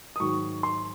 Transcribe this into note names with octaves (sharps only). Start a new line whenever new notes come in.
D#6
G#2 D#3 F#3 C#6
C6